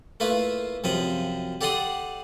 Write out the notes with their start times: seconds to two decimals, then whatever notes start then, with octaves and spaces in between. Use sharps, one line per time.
0.20 A3 A#3 E4 F4 B4
0.84 F#2 C3 F3 F4 D#5 B5
1.61 G4 A4 D5 F#5 C6 D#6